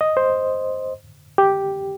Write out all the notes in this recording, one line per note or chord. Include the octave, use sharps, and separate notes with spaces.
D#5
C5
G4